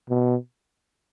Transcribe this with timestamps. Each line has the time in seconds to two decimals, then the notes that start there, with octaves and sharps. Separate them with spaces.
0.10 B2